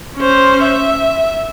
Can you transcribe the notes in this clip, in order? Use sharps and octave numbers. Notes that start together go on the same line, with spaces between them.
C#4 C5
E5